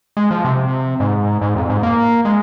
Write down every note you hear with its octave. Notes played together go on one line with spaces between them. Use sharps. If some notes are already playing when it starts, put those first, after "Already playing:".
G#3
F3
C3
G#2
G#2
F2
G#2
A#3
G#3